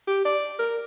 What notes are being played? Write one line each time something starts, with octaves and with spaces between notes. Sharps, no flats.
G4
D5
A#4